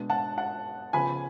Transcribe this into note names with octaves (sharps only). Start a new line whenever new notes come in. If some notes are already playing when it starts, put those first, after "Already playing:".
Already playing: B2 G#3 B3 D4
F#5 A5
F#5 A5
C#3 F3 B3 G#5 B5